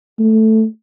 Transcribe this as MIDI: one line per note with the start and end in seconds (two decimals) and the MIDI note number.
0.19 0.64 57